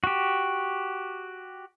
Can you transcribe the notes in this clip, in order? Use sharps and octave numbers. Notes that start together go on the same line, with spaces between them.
F#4 G4